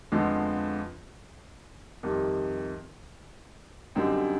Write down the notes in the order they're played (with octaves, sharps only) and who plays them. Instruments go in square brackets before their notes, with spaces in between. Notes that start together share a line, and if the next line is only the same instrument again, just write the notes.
[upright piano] F2 D3 F3 G#3 B3
F2 C3 D#3 G3
F#2 D3 G3 C4 D#4